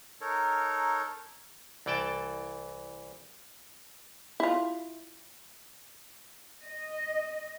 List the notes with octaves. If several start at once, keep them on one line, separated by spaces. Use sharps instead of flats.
D#4 A4 A#4 C#5
C2 E3 D5 G5 A5
E4 F4
D#5